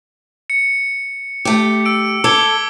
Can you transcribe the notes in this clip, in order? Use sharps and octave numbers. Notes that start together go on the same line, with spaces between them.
C#7
A3 G4
E6 D7
A4 D6 G#6 G7